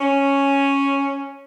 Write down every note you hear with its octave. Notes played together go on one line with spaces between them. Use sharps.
C#4